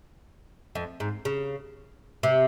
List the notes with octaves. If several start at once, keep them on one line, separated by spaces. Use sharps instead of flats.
F2
G#2
C#3
C3